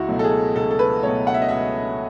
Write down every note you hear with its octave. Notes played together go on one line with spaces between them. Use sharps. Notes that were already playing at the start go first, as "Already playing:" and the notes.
Already playing: C#2 E4 F#4
B2 F#3 A3
A4
G#4
C#2 A4
A4
B4
B2 F#3 A3 C#5
F#5
E5
D#5
C#2 E5